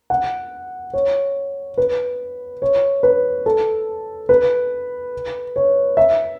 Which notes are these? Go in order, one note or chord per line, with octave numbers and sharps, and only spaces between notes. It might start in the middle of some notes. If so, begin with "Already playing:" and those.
F#5
C#5
B4
C#5
B4
A4
B4
C#5
E5